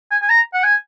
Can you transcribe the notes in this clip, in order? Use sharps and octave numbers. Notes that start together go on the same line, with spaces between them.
G#5
G#5
A#5
F#5
G#5